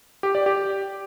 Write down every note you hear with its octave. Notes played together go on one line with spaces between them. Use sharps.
G4
D5
G4